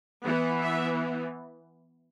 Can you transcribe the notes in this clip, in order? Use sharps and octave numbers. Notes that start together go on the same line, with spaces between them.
E3 B3 F#5
E5